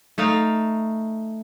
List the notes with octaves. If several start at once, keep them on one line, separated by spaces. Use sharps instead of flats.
A3 D#4 F5